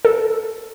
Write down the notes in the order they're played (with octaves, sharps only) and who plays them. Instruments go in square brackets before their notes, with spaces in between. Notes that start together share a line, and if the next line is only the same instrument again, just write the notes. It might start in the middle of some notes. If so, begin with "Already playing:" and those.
[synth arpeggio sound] A4